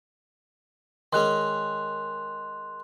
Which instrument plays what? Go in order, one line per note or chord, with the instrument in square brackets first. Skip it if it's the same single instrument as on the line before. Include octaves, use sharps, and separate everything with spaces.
[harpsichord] D#3 G#3 C#4 [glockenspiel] C6 F#6 F7